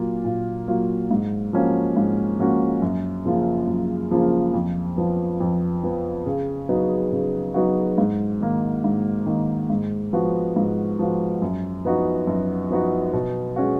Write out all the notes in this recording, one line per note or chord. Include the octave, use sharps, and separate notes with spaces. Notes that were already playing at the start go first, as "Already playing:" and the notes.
Already playing: A#2 F#3 A#3 F4
A#2
F#3 A#3 F4
G#2
F3 A#3 C#4 F#4
G#2
F3 A#3 C#4 F#4
F#2
C#3 F3 A#3 F4
F#2
C#3 F3 A#3 F4
F2
F3 B3
F2
F3 B3
C#3
F#3 B3 D#4 F#4
C#3
F#3 B3 D#4 F#4
G#2
D#3 A#3
G#2
D#3 A#3
G#2
F3 B3 F#4
G#2
F3 B3 F#4
F#2
F3 B3 D#4 F#4
F#2
F3 B3 D#4 F#4
B2
G#3 C#4 F#4